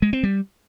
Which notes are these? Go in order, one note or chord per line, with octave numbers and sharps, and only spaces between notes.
G#3
C4
G3